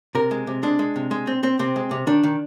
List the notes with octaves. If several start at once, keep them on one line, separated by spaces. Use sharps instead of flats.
C3 A#4
G#3
C3
G#3 D4
G#3
C3
G#3
C4
C4
C3 C4
G#3
C3
D#3 D4
D#3